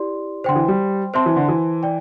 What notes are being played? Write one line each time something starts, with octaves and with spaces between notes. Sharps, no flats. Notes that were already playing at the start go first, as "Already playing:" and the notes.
Already playing: E4 G4 D5 C6
D3 C5 G5 C6
E3
G3
C4 C5 E5 A5 C6
E3
D3
E3
D5 G5